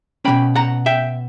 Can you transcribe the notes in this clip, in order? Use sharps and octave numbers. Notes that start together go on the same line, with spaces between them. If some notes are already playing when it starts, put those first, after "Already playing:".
B2 F#3 C#4 G5 B5
F#5 A#5
E5 G5